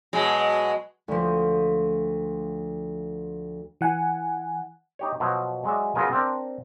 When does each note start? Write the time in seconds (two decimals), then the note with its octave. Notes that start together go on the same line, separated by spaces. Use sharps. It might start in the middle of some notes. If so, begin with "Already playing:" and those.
0.13 B2 F#3 G#3
1.08 D2 F3
3.81 E3 F#5 G#5
4.99 D#4 G4 C#5
5.20 B2 F3 F#3
5.64 F#3 G#3 D5 E5
5.95 C#3 F#3 B3 F4 A#4 G#5
6.13 C4 D4 A#4